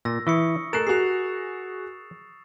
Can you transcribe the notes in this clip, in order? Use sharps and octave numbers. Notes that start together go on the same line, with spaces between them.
A#2 E6 A#6
E3 E4 C#6 D#6 C#7
A3 A#4 F#6 A6 C7 E7
F#4 G#4 C7 F7